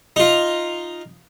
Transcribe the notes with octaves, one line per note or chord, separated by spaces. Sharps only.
D#4 F4